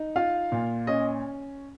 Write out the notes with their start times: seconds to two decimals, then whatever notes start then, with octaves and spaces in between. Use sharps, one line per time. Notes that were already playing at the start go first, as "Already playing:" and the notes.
Already playing: D#4
0.16 F4 F5
0.52 A#2
0.87 C#4 D#5